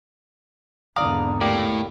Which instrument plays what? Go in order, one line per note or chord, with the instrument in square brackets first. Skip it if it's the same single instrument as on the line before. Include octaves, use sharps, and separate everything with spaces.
[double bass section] G#1 E2 D3 [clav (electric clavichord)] D5 F5 [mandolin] A#5 D#6
[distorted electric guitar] A2 [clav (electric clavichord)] A#3 G4 D5